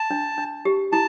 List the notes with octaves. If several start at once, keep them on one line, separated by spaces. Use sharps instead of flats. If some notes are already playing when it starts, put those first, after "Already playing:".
Already playing: A5
D4
D4
G4
E4 A5